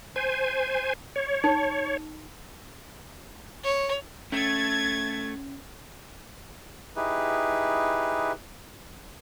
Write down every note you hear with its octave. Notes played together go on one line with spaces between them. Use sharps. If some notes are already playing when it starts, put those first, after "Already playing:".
C5 G#5
C#5
D#4
C#5
A3 C#4 G#6 A6
D#4 E4 G4 G#4 B4